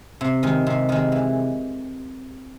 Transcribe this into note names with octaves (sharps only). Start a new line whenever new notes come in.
C3
D#3 G#3
C3
D#3 G#3
E3